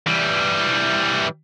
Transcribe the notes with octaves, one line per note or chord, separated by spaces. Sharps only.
E3 G3